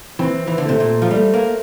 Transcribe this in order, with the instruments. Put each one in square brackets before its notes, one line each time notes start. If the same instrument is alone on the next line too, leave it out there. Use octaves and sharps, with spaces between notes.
[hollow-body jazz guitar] E3 [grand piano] C4
[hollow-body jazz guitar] E3
D3
[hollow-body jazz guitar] C3 [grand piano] A3
[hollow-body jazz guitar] A#2
F3
[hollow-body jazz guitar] G3 [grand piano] A3
[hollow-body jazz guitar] A#3